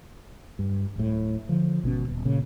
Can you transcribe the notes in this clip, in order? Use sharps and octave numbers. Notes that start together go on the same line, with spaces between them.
G2
D1 A2
D3 F3
G#1 B2 C#4
D#1
A#2 C#3